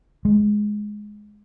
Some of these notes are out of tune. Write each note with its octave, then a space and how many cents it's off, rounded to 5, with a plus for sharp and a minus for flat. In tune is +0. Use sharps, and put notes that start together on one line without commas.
G#3 +10